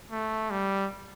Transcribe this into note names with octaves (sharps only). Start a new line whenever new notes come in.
A3
G3